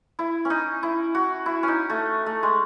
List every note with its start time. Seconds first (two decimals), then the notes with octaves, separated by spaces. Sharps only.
0.19 E4
0.45 C#4
0.50 D#4
0.83 E4
1.15 F#4
1.46 E4
1.63 C#4
1.68 D#4
1.90 A3
2.26 A3
2.43 G#3